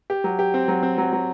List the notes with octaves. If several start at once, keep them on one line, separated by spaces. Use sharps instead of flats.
G4
F#3
G4
C4
F#3
C4
F#3
F#3